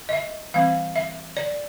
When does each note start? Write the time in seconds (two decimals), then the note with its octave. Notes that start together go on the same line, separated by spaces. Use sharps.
0.09 D#5
0.13 E5
0.54 E3 G3 C4 F5
0.96 E5
1.37 D5